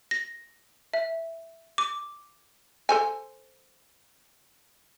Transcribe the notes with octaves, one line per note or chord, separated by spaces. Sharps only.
A#6
E5
D6
A4 C5 G#5